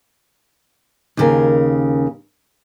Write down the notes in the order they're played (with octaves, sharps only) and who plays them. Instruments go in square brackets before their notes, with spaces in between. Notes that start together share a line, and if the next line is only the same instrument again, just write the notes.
[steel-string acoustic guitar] D#2 C#3 A#4